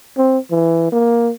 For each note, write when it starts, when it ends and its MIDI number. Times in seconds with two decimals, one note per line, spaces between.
0.17 0.39 60
0.51 0.88 52
0.92 1.32 58